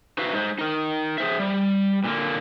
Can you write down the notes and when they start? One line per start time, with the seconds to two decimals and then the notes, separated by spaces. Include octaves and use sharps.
0.18 D#4 F#4 B4 C5 E5 F5
0.33 G#3 D#4 C5
0.59 D#4 A#4
1.18 G#4 C5 E5
1.39 G3
2.04 A#2 D3 A#3